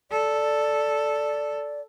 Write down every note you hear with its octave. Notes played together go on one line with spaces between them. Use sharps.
A4 D5